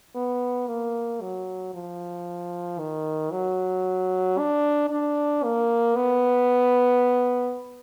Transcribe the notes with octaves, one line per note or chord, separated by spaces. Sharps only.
B3
A#3
F#3
F3
D#3
F#3
D4
D4
A#3
B3